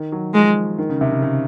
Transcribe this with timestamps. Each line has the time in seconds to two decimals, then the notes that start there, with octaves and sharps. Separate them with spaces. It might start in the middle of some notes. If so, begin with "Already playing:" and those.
Already playing: D#3
0.12 F#3
0.34 F3 G#3
0.78 D#3
0.89 C#3
1.01 C3
1.11 C#3
1.22 C#3